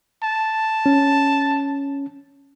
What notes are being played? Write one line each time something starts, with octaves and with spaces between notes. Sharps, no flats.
A5
C#4